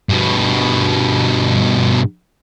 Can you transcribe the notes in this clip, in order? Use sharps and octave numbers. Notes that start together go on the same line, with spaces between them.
G2 B2